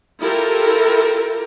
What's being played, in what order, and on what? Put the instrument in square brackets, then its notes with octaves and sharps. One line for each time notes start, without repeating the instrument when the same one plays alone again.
[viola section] E4 F4 G4 A4 A#4